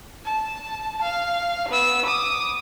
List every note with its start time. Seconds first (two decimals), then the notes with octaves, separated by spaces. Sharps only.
0.25 A5
1.02 F5
1.69 B3 E6
2.06 D6 D#6